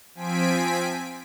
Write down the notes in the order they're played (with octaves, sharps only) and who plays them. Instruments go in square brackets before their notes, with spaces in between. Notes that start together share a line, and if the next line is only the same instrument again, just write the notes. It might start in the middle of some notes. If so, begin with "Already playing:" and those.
[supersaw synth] F3 C4 G#5 B6 D7